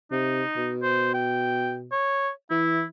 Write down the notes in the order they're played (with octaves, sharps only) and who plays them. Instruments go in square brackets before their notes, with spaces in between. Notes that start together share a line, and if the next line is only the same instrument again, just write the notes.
[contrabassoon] C3 [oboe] D#4
[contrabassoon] B2
[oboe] C5
G5
C#5
[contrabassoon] E3 [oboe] E4